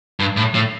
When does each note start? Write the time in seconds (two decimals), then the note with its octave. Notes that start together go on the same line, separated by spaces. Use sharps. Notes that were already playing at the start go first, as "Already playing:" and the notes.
0.20 G2
0.37 A2
0.55 A2